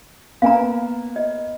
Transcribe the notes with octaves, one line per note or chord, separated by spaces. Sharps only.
A#3 B3 F5 G#5 A#5
D#5